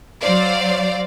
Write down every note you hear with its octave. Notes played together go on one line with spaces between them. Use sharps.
F#3 C5 D5 F5